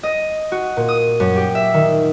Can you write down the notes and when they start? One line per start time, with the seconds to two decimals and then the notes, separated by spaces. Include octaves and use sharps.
0.03 D#5
0.52 F#4
0.77 A#2
0.88 D#6
1.20 F#2
1.36 G4
1.55 E5
1.74 D#3